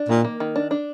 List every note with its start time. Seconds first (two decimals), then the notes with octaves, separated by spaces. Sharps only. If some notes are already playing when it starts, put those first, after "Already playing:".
Already playing: D4
0.09 A#2 D#3
0.25 A#3
0.40 D#3
0.56 D4
0.71 D4